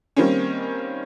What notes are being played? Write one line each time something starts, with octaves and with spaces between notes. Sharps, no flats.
D#3 G3 A#3 C4 C#4